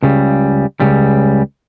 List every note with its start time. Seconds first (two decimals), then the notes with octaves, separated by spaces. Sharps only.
0.02 C#2 C#3 G3
0.80 C#2 C#3 G3